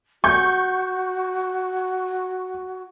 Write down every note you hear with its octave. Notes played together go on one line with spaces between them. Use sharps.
F#4 C#6 G6